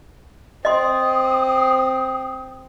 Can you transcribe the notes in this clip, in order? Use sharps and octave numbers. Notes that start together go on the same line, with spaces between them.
C4 D#5 C6 D#6